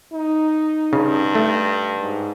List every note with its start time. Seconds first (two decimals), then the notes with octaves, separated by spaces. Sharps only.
0.14 D#4
0.93 G2 C#3
1.35 A3
2.02 G#2